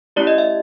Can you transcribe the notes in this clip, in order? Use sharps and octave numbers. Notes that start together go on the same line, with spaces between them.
A3 C#4 E4 G4 D5
D#5
E5